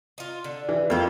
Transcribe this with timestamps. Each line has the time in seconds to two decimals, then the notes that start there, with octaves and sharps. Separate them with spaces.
0.18 D#4 F4
0.44 D3
0.69 E3
0.90 F2 A#3 E4 G4